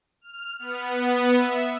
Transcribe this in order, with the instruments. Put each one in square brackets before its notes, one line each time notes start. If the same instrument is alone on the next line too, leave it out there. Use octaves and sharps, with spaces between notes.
[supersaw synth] F6
B3
E5